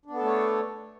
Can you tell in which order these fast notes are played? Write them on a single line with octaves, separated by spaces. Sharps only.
D4 B3 A4 A3 C#5